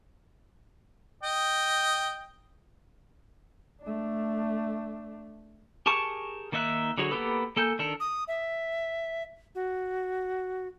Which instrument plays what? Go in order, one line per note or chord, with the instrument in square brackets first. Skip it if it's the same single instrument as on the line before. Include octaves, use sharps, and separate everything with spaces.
[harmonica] D#5 G5
[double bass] A3 D4
[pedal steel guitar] G4 G#4 A#4 A5 C#6
D#3 A#3 D#4 E5 F#6
D3 F#3 F#4 G#4 C#5
A#3 B3 G4 A4 B4
A#3 A4 G#5 G6
D#3 D4 A4 A#4
[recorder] D#6
E5
F#4